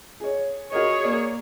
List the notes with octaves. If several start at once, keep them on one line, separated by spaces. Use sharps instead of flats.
G#4 C#5
F#4 G#4 A#4 C#5 D#5
A#3 D5